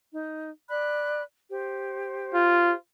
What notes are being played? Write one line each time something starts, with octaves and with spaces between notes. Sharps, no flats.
D#4
D5 B5 F#6
G4 C5
F4